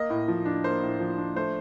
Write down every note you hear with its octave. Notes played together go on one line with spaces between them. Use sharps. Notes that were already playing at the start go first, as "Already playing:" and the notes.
Already playing: A#3 D#5
A2
F3
D4
A#3 C5
A2
F3
D4
A3 C5